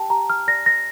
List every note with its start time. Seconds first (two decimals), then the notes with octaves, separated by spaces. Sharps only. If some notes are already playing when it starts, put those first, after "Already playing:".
Already playing: G4 G5 A5
0.10 G4 A#5
0.30 F6
0.48 D5 A#6
0.66 A#6